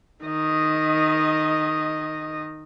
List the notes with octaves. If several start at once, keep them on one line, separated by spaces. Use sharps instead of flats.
D#3 D#5